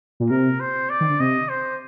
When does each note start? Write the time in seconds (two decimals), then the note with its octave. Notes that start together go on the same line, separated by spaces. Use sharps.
0.20 A#2
0.30 C3 A#4
0.60 C5
0.90 D5
1.01 D#3
1.09 D3
1.20 C3 D#5
1.49 C5